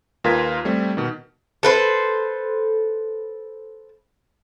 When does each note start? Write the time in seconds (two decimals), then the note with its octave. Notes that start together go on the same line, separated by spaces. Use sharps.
0.24 D#2 F4 A#4 B4 G#6 B6
0.65 G3 A3 C4
0.97 B2 D#3
1.63 A4 B4 C5